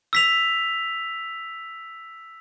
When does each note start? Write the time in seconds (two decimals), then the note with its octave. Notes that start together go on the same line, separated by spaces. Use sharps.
0.13 E6 B6 F7